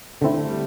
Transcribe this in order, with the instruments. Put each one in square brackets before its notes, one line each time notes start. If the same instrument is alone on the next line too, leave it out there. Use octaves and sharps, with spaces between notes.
[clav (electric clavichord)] D3 C4 E4 [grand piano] A3
[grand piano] A3
G3